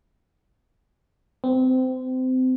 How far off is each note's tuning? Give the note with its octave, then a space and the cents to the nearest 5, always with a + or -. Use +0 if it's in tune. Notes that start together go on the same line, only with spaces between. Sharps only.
C4 -25